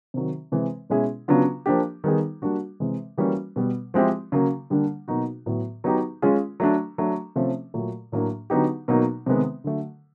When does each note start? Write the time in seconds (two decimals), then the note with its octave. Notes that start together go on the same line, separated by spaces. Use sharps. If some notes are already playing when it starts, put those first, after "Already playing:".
0.14 C3 D#3 F#3
0.52 C3 E3 G#3
0.90 B2 G#3 C#4 E4 G#4
1.28 C#3 F#3 B3 D4 F4
1.66 F3 A#3 D4 G4
2.04 D#3 G3 B3 D#4 G#4
2.42 G3 A#3 D4 F#4
2.80 C3 E3 G#3
3.18 E3 G3 A#3 C#4 F#4
3.56 B2 G3 B3
3.94 F3 G#3 C4 E4 G4
4.32 C#3 F#3 A#3
4.70 D3 G3 A#3 D4
5.08 B2 F#3 A#3 D#4 F#4
5.46 A2 F#3 B3
5.84 F#3 B3 D#4 G4
6.22 G#3 C#4 F4 G#4
6.60 F#3 A3 D4
6.98 F#3 A3 D4
7.36 C3 F3 A3 C#4
7.74 A#2 F#3 A3
8.12 A2 F#3 A#3 D4
8.50 D3 F#3 B3 D#4 G4
8.88 B2 F#3 A#3 D#4
9.26 C3 D#3 G#3 B3
9.64 D3 F#3 A3